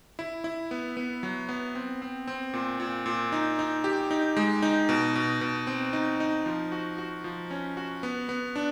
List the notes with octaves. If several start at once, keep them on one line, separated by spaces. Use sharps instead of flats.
E4
E4
B3
B3
F#3
B3
C4
C4
C4
A#2
A#2
A#2
D#4
D#4
G4
D#4
G#3
D#4
B2
B2
B2
C4
D#4
D#4
F3
F#4
F#4
F3
C#4
F#4
B3
B3
D4